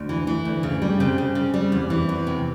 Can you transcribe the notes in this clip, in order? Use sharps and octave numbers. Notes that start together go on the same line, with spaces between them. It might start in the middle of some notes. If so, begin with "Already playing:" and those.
Already playing: D2
E3
E3
D2
C#3
G3
C#3 C4
C#3
C#3
G3
E2
E3
E2
C3